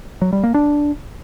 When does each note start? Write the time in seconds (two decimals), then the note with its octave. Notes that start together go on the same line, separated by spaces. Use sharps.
0.22 F#3
0.32 G3
0.43 A#3
0.54 D4